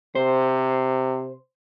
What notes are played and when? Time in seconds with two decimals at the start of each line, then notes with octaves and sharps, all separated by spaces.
0.15 C3 C5